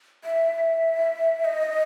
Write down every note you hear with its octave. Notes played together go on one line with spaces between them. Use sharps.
E5
D#5